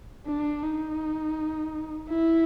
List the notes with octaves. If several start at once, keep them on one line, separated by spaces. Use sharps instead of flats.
D4
D#4
E4